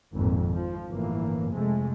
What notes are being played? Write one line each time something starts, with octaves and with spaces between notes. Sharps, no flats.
G#1 F2 A#2
F3
G1 A2 E3 A#3
F2 C3 G#3 A3